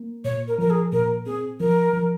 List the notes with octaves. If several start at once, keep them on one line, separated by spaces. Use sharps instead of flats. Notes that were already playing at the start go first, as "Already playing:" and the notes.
Already playing: A#3
A#2 C#5
A#4
F3 A#4
G#4
A#2 A#4
C4 G#4
F3 A#4
F3